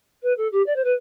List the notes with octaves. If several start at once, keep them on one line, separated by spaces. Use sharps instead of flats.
B4
A4
G4
D5
C5
B4